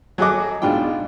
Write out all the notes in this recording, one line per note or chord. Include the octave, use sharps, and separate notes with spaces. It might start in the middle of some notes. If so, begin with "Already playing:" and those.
F#3 F#4 G#4 A4 D#5 D6
G#2 B2 D4 F4 G5